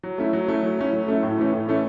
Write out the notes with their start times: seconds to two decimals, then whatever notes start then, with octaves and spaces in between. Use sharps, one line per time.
0.03 F#3
0.18 A3 C#4 E4
0.33 F#3
0.48 A3 C#4 E4
0.63 F#3
0.79 A3 C#4 E4
0.93 F#3
1.08 A3 C#4 E4
1.23 A2
1.38 E3 A3 C#4
1.53 A2
1.68 E3 A3 C#4